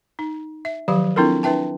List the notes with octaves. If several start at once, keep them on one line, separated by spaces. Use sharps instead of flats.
D#4
E5
D#3 F3 F#3 G4 F5
C4 D4 E4 F4 A4 A#4
D4 E4 B4 E5 G5 A5